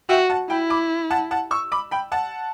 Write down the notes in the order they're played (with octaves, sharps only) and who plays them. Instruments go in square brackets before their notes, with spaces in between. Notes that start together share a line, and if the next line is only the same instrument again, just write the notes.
[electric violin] F#4 [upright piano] E5 G5
[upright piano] F#5 A5
[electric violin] E4 [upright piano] G5 B5
[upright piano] B5 D6
F#5 A5
F#5 A5
C#6 E6
B5 D6
G5 B5
F#5 A5